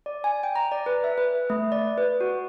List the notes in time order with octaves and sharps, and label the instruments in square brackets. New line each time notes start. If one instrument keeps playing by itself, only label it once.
[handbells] D5
G#5
G5
A#5
D5
B4
E5
B4
A3
D5
B4
F#4